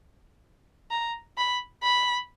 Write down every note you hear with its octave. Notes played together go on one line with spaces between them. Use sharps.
A#5
B5
B5